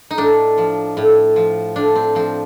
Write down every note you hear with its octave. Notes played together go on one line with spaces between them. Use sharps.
D#4
A2 D4
F3
A2
F3
A2 D4
C4
F3 C4